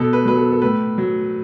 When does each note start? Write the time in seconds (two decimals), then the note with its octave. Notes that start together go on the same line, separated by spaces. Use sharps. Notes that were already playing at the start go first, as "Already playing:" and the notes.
Already playing: B2 A4
0.13 B4
0.25 F#3 B4
0.37 A4
0.52 A4
0.62 A2 B4
0.98 F#3